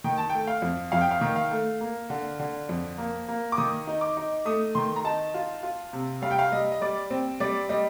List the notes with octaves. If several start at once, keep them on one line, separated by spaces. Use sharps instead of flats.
D#3 G5
A5
A3 G5
F5
F2
F2 F5
G5
F5
D#3
F5
A3
A#3
D3
D3
F2
A#3
A#3
D6
D#3 D#6
D#4
D6
D#4
A3 D#6
D#3 C6
A#5
D#4 A5
F4
F4
C3
G3 F5
G5
F5
G3 D#5
D#5
G3 D5
C4
G3 D5
G3 D#5